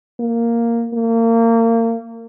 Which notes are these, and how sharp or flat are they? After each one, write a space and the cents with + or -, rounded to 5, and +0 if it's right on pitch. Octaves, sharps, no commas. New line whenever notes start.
A#3 -5
A#3 -30